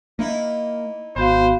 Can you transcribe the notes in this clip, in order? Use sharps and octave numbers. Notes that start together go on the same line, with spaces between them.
A#3 D#4 E4
G#1 B3 F#4 C5 F5